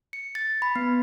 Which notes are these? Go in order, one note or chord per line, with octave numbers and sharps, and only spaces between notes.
C#7
A6
B5
B3